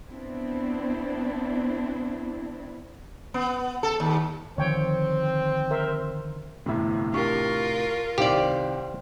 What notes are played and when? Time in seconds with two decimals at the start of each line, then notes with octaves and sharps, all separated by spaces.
0.10 B3 C4 D4 E4
3.34 B3
3.83 A4
4.00 D#2
4.58 D3 D#3 F3 C4 C#5 G5
5.71 A#4 C5 E5
6.66 G1 F2 A2 C3 E3 E5
7.14 D4 F4 G4 A#4 C#6
8.18 C2 D#3 G4 C5 D5 F5